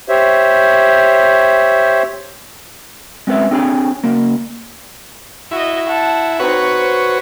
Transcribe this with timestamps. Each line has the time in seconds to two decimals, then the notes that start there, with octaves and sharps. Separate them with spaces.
0.09 G4 C5 C#5 E5
3.27 G#3 C4 C#4 B4 C#5 E5
3.51 C4 D4 G#4 C#5 G#5 B5
4.04 C#3 A#3
5.51 E4 F#4 D#5
5.88 F#5 A5
6.40 C4 D#4 F#4 B4 C#5
6.78 C5